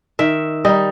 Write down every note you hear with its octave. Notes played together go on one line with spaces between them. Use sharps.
D#3 E5
G3 D#4 D#5